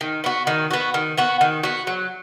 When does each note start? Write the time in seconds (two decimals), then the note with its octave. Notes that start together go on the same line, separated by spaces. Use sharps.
0.01 D#3
0.24 B3 F#4
0.47 D#3
0.71 B3 F#4
0.94 D#3
1.17 B3 F#4
1.41 D#3
1.63 B3 F#4
1.87 F#3